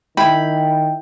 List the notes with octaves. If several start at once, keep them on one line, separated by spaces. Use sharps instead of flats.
D#3 E4 G5 B5